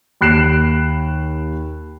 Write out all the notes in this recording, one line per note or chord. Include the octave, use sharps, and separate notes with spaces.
D#2 B5 F#6 C7 D7 E7